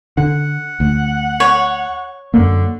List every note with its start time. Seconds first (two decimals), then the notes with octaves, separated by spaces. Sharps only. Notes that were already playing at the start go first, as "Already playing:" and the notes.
0.17 D3 F#5
0.80 D2
1.40 C#5
2.34 F#2 D3 A#3